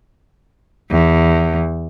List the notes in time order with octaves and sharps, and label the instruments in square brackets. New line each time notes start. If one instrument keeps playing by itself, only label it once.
[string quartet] E2